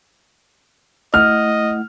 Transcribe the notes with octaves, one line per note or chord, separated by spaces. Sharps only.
A3 E4 D#5 F#5 F6